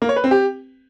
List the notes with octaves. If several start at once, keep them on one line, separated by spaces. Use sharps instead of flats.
A#3
C#5
B4
C4
G4